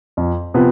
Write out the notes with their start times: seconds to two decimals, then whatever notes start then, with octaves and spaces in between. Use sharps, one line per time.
0.17 F2
0.54 C3 F3 B3